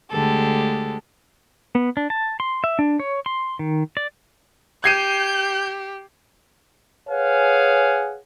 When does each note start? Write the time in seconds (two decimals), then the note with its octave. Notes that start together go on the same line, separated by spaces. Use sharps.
0.11 D2 D3 G#3 G4 A4
1.75 B3
1.97 D4
2.10 A5
2.40 C6
2.64 E5
2.79 D4
3.00 C#5
3.26 C6
3.59 D#3
3.97 D5
4.84 G4 G6 G#6 C7 D#7
7.09 G#4 B4 C#5 F5 F#5 G#5